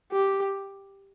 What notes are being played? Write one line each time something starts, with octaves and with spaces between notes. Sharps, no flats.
G4